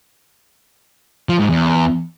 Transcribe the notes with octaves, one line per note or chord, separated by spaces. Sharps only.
F3
G#2
E2